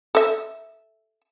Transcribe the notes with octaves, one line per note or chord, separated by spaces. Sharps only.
A4 E5